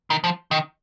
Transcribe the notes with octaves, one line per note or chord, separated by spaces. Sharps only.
D#3
F3
D#3